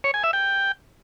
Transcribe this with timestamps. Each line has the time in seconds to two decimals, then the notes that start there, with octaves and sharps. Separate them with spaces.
0.04 C#5
0.14 G#5
0.24 E5
0.33 G5